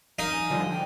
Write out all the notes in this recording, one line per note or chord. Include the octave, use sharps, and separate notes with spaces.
D#4 A#4
G#5
D3 F3 G3
G5